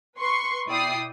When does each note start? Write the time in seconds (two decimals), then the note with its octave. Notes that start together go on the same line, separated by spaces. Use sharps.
0.19 B4 C6 C#6
0.67 B2 E4 D5 G5 D#6 C7